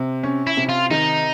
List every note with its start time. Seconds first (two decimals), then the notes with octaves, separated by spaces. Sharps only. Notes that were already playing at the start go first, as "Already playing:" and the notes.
Already playing: C3
0.23 C#4
0.47 E4
0.57 C3
0.69 F4
0.91 D#3 D#4